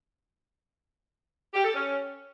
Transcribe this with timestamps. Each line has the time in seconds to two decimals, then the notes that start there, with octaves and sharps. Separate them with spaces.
1.53 G4
1.64 A4
1.74 C#4